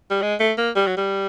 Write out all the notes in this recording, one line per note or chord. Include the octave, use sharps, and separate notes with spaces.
G3
G#3
A3
A#3
G3
F#3
G3